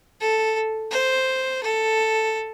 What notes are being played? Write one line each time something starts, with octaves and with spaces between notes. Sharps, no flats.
A4
C5
A4